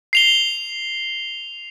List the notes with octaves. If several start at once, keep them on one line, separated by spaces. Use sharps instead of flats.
C7 F7 G7